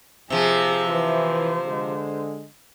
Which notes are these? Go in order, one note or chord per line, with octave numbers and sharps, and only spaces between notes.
C3 F3 G#4
E3 C5
D3 G#3